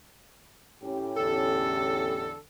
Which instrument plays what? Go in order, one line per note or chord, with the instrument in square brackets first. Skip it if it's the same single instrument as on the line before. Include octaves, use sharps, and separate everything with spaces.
[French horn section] A2 C#4 G4
[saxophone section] E2 D3 A4